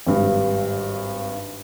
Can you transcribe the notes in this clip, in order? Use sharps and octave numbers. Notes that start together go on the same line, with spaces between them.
G#1 G2